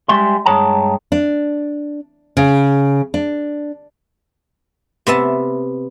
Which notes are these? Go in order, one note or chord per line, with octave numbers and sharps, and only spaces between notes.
G3 G#3 E5 C6
G2 G#3 C#5 A5 A#5
D4
C#3
D4
C3 B3 E5 A5